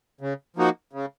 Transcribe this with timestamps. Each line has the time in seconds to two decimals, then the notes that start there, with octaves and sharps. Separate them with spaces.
0.21 C#3
0.56 F3 A#3 D#4 F#4
0.93 C#3